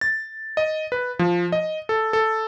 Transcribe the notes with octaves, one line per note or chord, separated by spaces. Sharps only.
A6
D#5
B4
F3
D#5
A4
A4